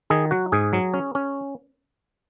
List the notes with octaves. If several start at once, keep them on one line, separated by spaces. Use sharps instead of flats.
D#3 G#4
F#3 F#4
G#2 G#4
F#3
C#4
C#4